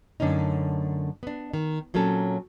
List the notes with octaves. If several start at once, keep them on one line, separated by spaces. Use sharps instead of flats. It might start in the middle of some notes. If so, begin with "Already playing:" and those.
F#2 D3 A3 C#4 D#4
B3 D4
D#3
A#2 F#3 C4 C#4 A4